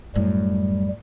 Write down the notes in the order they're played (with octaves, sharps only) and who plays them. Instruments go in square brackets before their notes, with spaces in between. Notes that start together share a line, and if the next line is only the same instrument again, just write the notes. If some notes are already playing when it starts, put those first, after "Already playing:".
[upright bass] F#2 A2 [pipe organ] G3